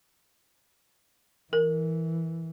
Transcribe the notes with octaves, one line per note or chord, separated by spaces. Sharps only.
E3 A#4